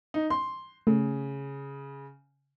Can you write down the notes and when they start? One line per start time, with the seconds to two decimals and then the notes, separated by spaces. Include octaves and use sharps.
0.14 D#4
0.30 C6
0.87 C#3 A3